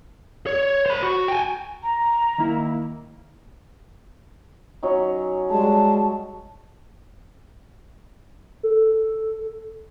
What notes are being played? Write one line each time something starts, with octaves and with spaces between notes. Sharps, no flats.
C#5
C5 B5
F#4
G5 G#5
A#5
D#3 A#3 E4
F#3 C#4 D#4
G3 G#3 A5
A4